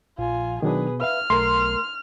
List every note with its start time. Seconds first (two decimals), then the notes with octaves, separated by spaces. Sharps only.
0.18 A#1 F4 G#5
0.62 B2 D#3 F#3 D4 G#4 B4
1.01 B4 E5 F5 F6
1.30 B1 A3 A#4 C6